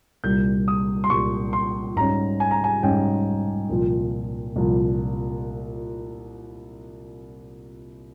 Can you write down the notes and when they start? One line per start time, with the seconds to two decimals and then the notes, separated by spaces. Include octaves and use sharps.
0.24 C2 A#2 G3 G6
0.68 D#6
1.04 C6
1.10 C2 A#2 G3 C#6
1.53 C6
1.96 G#2 G3 C#4 A#5
2.40 G#5
2.51 A#5
2.64 G#5
2.82 G#2 G3 C#4 G5
3.69 C2 A#2 F3
4.56 C2 A#2 F3